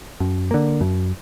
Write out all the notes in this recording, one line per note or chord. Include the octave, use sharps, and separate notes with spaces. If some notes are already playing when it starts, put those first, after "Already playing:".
F#2
D3 A#3
F#2